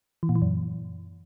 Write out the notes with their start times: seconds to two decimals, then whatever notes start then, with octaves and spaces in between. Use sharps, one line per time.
0.23 E3
0.29 A#2
0.35 E3
0.42 F#2